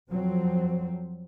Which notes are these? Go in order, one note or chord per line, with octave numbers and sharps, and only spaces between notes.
F2 F3 F#3 C4